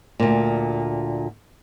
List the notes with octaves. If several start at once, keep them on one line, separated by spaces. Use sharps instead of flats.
D2 A#2